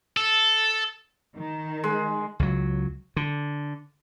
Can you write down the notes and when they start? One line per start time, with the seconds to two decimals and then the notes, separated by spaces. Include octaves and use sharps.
0.17 A4
1.36 D#3
1.84 G#3
2.39 C#2 F#3
3.16 D3